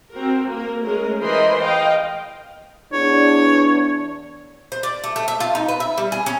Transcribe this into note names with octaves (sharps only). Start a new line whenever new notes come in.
C4 F#4 A#4
A#3 A#4
G#3 A3 C#4 A#4
E3 A#4 C5 D#5 B5 C6
D#5 F5 G5
E2 D4 C#5
C5
D5
A3
A3
E5
F4
D#4
B4
E5
G3
G#4
C#4